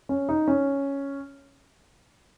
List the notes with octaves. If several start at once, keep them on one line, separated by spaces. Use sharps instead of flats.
C#4
D#4
C#4